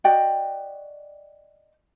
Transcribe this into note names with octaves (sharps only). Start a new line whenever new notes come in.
F#4 D5 D#5 G5